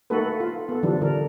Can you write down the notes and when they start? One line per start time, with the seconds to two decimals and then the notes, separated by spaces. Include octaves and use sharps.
0.10 A3 A#3 D#4 F#4 A4 B4
0.40 F4
0.69 B3 A4
0.83 D3 E3 F3 G3 D4
1.01 D3 D4 F4 A#4